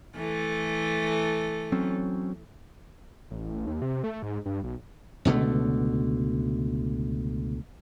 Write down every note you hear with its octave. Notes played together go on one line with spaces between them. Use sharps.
E3 A3 A4
F#3 C4 C#4
A1
D#2
C3
A3
G#2
G2
B1
C#2 B2 D3 A3